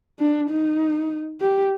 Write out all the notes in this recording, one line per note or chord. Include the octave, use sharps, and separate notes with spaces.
D4
D#4
G4